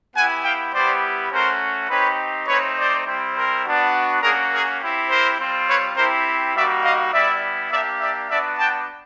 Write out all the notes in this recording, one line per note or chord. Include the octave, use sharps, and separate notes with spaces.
B3 E4 G4 F#5 G#5
F5 G5
G3 B3 E4 G4 C5 D5
A3 C#4 F#4 A#4 C5
C4 D#4 G4 B4 C#5
A3 C4 D#4 B4 C#5
C5 D5
G3 C4 E4
A#4 C5
B3 D4 F#4
A#3 C#4 F#4 G#4 A#4
G#4 A#4
C4 E4 G4
A#4 C5
G3 C4 F4
B4 C#5
C4 E4 G4 A#4 C5
G3 A#3 D#4 F#4 D5 E5
D#5 F5
G3 B3 E4 D5 E5
A#3 D4 G4 D5 E5
D5 E5
B3 D4 F#4 D5 E5
G5 A5